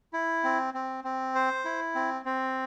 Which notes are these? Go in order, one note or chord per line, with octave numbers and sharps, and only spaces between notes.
E4
C4
C4
C4
C5
E4
C4
C4